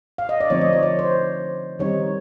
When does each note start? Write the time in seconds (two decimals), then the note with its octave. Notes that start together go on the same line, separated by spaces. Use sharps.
0.18 F5
0.29 D#5
0.40 D5
0.50 D3 F3 A3 C4 D#4 C#5
0.61 D#5
0.73 D5
0.83 C#5
0.99 C5
1.79 D#3 G3 C4 D#4 C#5